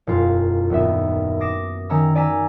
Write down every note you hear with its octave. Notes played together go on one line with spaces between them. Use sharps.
E1 F#2 F4
D#1 D#2 B3 E5
D6 D#6 A#6 C7 D7 E7
D#3 C#4 A#5 E6
D5 G#5 A#5 E6 B6